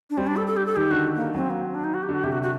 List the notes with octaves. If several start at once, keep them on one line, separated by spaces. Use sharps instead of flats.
D4
G3 C4
D4
A4
A4
G4
A4
D#3 G4
D3 F#4
A#3
F#3 C4
A#3
C4
D4
D#4
F#4
G4
D3 F#4
C3 G4
F#4
F#4